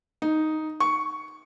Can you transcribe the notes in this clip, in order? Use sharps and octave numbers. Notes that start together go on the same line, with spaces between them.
D#4
C#6